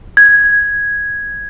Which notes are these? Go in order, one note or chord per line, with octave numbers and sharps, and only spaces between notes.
G#6